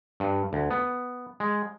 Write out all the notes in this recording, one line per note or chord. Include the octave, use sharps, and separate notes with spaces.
G2
D2
B3
G#3